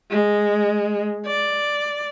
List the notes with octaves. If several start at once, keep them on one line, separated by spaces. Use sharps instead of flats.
G#3
D5